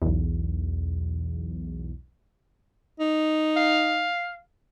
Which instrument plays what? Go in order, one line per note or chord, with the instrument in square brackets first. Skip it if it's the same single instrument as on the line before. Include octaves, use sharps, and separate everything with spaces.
[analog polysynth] B1 E2
[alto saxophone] D#4
[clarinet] F5